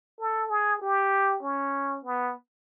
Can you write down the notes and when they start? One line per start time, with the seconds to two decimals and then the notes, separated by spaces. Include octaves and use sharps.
0.20 A4
0.50 G#4
0.82 G4
1.43 C#4
2.05 B3